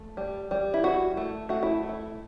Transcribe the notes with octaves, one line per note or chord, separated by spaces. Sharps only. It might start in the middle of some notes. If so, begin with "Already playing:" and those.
Already playing: A3
G3
G3
E4
E4 F#4
A3
A3 F#4
E4
A3
E4